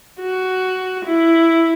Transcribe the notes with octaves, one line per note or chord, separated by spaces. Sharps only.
F#4
E4